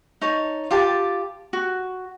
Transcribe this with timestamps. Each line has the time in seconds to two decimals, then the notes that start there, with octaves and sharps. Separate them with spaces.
0.21 D#4 C#5 A5
0.71 F4 G4 A5
1.53 F#4